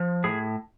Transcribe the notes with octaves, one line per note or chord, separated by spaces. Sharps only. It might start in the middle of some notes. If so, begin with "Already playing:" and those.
Already playing: F3
A2 G#4